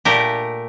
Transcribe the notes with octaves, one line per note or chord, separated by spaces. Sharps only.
A#2 A3 G4 A#4